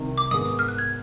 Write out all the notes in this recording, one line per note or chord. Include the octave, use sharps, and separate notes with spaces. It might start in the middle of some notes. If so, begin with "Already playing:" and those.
Already playing: C2 C3 D#3
D6
G#2 D#3 G#3 B3 D#6
F6
F#6
G#6